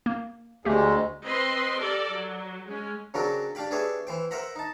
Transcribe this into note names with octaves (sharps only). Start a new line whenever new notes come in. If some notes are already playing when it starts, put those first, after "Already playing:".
A#3
D2 G#3 A3 G4
C4 B4 D#5 C6
G4 A4 A#4 D5
F#3
G#3 C#4
C#3 F#3 C4 D4 F#4 A#4
D4 G4 F5 G5 B5
D4 G4 G#4 B4 C#5 E5
E3 C5 G5
A#4 C5 E5 F#5 A#5 B5
D#4 A5